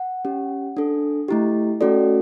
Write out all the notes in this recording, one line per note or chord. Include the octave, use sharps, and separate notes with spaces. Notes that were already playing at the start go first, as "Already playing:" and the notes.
Already playing: F#5
C#4 G4
D4 A4
A3 E4 G4
A3 C#4 F#4 A4 D5